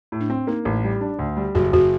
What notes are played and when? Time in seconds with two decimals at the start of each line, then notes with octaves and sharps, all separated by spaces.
0.12 A2
0.20 D4
0.30 C4
0.47 A#3 D#4
0.65 A1
0.84 G3
1.01 D4
1.19 D2
1.37 G3
1.55 F#1 F#4
1.73 F#1 F#4